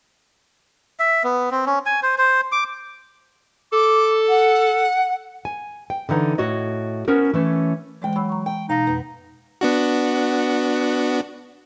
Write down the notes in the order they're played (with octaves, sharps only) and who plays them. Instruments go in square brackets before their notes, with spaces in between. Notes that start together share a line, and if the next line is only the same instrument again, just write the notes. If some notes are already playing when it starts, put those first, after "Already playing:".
[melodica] E5
B3
C4
C#4
G#5
C5
C5
D6
[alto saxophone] A4 [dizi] D6
[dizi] F#5
[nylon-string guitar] G#5
G5
D3 E3 D#4 F#5
A2 F#4 C#5 D#5
B3 C#4 F#4 A#4 C5
E3 A3 C#4
[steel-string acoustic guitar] D2 G#2 G5 [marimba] E3 G#3
[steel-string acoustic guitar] F#3 [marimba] B5 E6
[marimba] A#5 C#6
[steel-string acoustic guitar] G5
[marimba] B2 A5 A#6 [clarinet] D#4 [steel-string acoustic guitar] F5
[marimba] F2 [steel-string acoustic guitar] B3
[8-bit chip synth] B3 D4 F#4